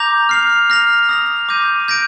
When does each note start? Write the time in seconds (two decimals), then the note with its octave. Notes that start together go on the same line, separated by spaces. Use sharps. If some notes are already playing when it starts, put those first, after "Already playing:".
Already playing: A#5 D6 G6 A#6 F7
0.29 F6 C7 F7
0.70 F6 A#6 F7
1.09 D#6 A#6 F7
1.49 D6 G6 A#6 D#7
1.88 G6 A#6 D7